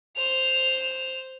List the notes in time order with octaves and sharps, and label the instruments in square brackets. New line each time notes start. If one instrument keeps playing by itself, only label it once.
[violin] C5 F7